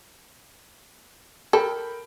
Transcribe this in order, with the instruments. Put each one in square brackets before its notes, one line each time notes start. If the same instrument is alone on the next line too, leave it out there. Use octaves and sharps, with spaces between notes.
[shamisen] A4 [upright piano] A#4 G5 B5